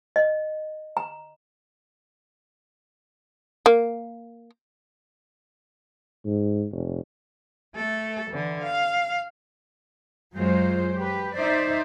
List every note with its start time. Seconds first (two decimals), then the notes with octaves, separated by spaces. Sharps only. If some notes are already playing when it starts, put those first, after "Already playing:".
0.16 D#5
0.97 A#5
3.66 A#3
6.26 G#2
6.71 F1
7.76 A3 A4
8.30 D3 E3
8.63 F5
10.36 F#2 F#3 G#3 F4 C5
10.95 G4 B4
11.37 D#4 C5 D5 E5